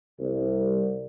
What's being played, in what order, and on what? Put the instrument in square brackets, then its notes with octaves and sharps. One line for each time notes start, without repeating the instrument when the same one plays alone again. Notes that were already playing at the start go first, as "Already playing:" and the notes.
[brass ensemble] C2